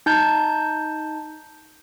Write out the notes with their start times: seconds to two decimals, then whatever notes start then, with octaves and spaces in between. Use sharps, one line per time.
0.06 D#4 A5 G6